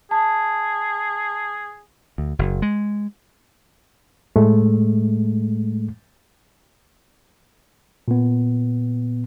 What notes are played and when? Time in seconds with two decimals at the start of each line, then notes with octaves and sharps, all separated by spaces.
0.11 G#4 A5
2.18 D2
2.39 F#1
2.62 G#3
4.36 A2 G#3 A3
8.08 A#2 B3